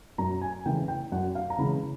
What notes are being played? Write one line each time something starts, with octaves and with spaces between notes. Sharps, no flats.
F#2 A#5
G#5
C#3 E3 G#3 G5
G5
F#2 F#5
F5
A#5
C#3 E3 G#3 B5